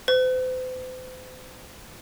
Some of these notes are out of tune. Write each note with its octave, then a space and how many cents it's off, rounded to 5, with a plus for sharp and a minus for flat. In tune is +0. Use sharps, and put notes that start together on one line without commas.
C5 -40